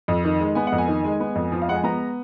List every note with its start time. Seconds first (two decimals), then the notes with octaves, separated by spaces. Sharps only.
0.08 F2
0.24 D#3
0.40 G#3
0.55 B3 G#5
0.67 F#5
0.72 F2
0.78 G#5
0.88 D#3
1.04 G#3
1.20 B3
1.35 F2
1.52 F3
1.62 F5
1.69 G#3 F#5
1.76 G#5
1.84 B3 A#5